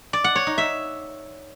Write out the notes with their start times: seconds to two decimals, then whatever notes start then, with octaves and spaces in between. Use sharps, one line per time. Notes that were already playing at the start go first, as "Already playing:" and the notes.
0.13 D5
0.24 F#5
0.36 C#5
0.47 D#4
0.58 E5